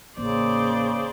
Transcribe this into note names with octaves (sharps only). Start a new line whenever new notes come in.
A1 C#3 A#3 C5 D5